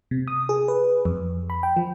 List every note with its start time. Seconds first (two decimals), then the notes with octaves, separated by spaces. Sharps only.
0.11 C3
0.28 D#6
0.49 G#4
0.68 B4
1.05 F2
1.50 B5
1.63 G5
1.77 F3